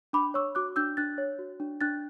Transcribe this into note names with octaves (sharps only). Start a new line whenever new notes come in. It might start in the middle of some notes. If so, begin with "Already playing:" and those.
D4 B5 D6
C#5 C#6 E6
F#4 D6 F#6
D4 E6 G6
D4 F#6 A6
C#5
F#4
D4
D4 F#6 A6